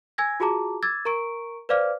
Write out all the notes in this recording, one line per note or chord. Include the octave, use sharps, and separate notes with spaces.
G#5 E6 G#6 A#6
F4 F#4 G#4 A5 A#5 D6
D6 E6 G#6 A6
A#4 A#5 C#6 D7
B4 C5 D5 F5 D6 F6